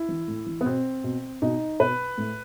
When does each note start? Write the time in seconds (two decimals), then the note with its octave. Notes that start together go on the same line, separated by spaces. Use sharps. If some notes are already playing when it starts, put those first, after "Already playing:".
Already playing: E4
0.09 E3
0.28 A2
0.46 E3
0.61 B3
0.65 B2 C4
1.04 B2
1.42 B2 D#4
1.80 B2 B4
2.18 A2